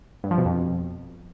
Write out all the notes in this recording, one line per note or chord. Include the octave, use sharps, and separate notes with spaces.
G2
F3
B2
F2